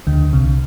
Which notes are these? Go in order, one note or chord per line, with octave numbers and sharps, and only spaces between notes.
D2 D3
C2 C3